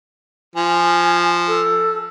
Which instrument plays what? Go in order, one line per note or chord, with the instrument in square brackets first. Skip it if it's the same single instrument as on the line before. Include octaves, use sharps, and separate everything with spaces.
[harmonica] F3 [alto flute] G#5
[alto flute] A4